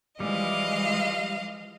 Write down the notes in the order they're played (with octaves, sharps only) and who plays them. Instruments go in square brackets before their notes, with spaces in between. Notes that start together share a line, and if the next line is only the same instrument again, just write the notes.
[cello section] E3 F3 G#3 [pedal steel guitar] G3 [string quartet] D#5 F5